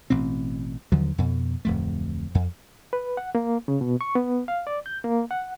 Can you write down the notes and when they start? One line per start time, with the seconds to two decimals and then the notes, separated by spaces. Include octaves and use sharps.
0.10 A1 B2 C4
0.92 D#2 D3 F3 F#3
1.18 F2 B2
1.65 D1 F2 A3
2.35 F2
2.93 B4
3.17 F#5
3.35 A#3
3.68 C#3
3.81 B2
4.01 C#6
4.15 B3
4.48 F5
4.67 D5
4.86 G6
5.04 A#3
5.31 F#5